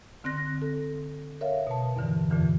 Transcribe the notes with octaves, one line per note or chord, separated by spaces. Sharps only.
D3 C4 F#6 A#6
A4
A#4 C#5 E5 F5
B2 A5
E2 G2 D3 E3
F2 A#2 D3 E3